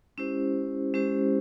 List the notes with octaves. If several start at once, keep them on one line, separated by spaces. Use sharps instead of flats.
G#3 C#4 E4 G4 C5
G#3 C#4 E4 G4 C5